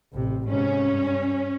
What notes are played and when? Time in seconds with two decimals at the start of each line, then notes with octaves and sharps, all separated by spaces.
0.14 A1 C3
0.49 G#2 C3 C#4
0.84 G2